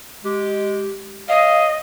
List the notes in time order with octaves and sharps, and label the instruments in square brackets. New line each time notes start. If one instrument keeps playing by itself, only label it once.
[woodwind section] G#3 G4
[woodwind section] C#5 F5 [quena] D#5